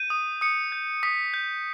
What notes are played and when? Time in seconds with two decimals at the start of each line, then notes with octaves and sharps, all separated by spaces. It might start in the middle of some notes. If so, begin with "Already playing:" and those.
Already playing: G6 D#7
0.10 D#6
0.41 D#6 C#7
0.72 G6
1.03 D#6 B6
1.34 G6